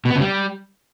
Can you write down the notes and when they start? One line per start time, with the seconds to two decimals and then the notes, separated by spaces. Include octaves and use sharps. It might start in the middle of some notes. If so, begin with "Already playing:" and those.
0.05 B2
0.10 B3
0.16 C#3
0.21 G3